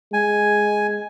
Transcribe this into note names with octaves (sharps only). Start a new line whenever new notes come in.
G#3 G#5